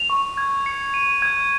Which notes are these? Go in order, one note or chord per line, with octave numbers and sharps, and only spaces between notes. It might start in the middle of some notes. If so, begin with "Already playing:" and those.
Already playing: F7
C#6
G#6
C#7
D#7
G#6